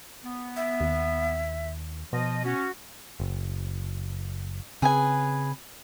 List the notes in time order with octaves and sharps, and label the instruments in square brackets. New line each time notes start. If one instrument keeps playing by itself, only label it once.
[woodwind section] B3
[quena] E5
[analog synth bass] D#2
[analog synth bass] B2 [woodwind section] F3 D#5
[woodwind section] C#4 [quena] F#4
[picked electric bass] F#1
[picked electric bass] C#3 C4 [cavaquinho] G#4 B4 G#5